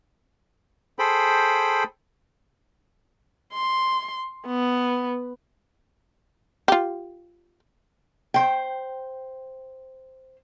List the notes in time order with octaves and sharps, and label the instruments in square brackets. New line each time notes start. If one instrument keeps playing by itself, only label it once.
[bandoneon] G#4 A4 C5 G5 B5
[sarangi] C6
B3
[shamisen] F4 G4
[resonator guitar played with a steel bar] C5 G5